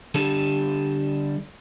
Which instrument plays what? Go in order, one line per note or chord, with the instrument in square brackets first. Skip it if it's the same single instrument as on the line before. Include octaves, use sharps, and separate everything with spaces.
[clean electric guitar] D3 G3 A4